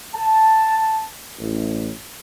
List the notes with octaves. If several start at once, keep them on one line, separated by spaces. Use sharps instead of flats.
A5
A1